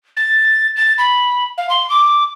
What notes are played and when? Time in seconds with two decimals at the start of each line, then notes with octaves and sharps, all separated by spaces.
0.17 A6
0.76 A6
0.98 B5
1.58 F5
1.70 C6
1.90 D6